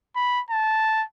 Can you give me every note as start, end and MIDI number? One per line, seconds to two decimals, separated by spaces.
0.16 0.41 83
0.51 1.04 81